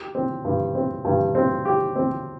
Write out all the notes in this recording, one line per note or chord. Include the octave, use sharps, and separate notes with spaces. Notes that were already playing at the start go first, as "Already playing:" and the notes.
Already playing: G4
C4
G2
C4
G2
C4
G4
C4